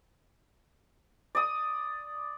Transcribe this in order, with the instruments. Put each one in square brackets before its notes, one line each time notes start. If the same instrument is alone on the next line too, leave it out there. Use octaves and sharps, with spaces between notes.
[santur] D5 D#6